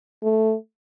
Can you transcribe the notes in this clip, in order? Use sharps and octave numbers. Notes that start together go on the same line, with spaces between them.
A3